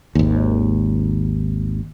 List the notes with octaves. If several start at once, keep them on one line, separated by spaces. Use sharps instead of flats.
G#1 D#2